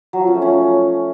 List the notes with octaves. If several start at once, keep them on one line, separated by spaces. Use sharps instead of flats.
F#3
F3
C#4
A3
C#4